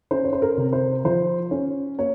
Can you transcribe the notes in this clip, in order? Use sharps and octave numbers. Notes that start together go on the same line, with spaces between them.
C#4 C5
C#5
C5
A#4
C3
C5
F3 C5
C#4
A#3 C#5